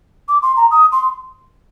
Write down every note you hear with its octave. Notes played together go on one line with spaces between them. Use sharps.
D6
C6
A#5
D#6
C6